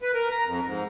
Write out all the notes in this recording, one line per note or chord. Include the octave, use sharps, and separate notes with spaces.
B4
A#4
A#5
F2
G#2